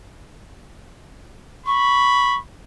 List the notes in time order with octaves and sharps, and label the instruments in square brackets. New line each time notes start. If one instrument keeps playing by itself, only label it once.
[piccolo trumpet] B5 [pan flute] C#6